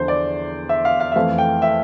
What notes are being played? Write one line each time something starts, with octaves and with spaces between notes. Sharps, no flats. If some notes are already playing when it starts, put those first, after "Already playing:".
Already playing: E2 D3 F3 C5
D5
E5
F5
F5
E5
F2 E3 A3 F5
G5
E5